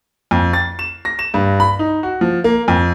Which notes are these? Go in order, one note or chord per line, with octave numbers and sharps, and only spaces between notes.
F2
A6
E7
A#6
E7
G2
B5
D#4
F#4
F3
A#3
F2